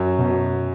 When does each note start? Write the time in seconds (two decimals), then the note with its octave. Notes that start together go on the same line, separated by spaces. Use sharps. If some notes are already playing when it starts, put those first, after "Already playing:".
Already playing: F#2 F#3
0.19 B2